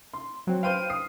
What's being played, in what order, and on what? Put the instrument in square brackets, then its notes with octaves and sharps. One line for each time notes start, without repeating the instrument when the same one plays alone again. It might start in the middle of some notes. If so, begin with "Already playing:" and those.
[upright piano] C6
[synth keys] F#3 C4
[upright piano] B4 C5 F6 [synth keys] F5 G5 D#7
[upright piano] D#6 C7